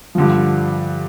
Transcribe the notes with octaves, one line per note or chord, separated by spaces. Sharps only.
G2 D3 F3